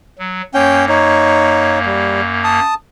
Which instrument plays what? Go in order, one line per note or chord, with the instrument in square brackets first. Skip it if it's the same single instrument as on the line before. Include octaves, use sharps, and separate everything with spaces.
[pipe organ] F#3
[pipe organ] F#2 A#3 [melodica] C#4 G5
[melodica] D#4 C#5
G3
A5 D#6